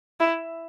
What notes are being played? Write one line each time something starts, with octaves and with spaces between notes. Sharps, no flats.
E4